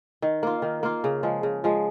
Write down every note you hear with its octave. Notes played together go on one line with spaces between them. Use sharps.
D#3
A#3 F4
D#3
A#3 F4
C#3
F3 G#3
C#3
F3 G#3